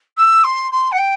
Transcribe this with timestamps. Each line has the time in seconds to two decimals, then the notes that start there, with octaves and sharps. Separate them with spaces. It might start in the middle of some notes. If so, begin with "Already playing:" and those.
0.17 E6
0.44 C6
0.72 C6
0.91 F#5
0.98 G5